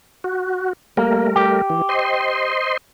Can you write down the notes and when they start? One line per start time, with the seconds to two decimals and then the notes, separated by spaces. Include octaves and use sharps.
0.24 F#4
0.97 G3 A3 A#3 A#4
1.36 G4
1.70 E3
1.89 C5 D#5 C6